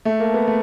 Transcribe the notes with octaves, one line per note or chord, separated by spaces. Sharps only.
A3
A#3
B3
A3